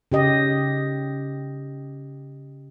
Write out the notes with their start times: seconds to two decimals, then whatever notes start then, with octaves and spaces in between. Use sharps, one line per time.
0.12 C#3 G4 D#5